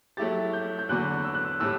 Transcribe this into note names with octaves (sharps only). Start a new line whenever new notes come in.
F#3 A3 E4 G4 A6
G6
G6
E2 D3 F#3 B3 F#4 F#6
E6
F#6
E6
A2 G3 E6